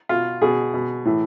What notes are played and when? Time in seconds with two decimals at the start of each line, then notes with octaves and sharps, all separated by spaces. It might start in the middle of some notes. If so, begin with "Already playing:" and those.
0.09 B2 F4
0.42 B2 G#4
0.74 B2
1.05 A2 E3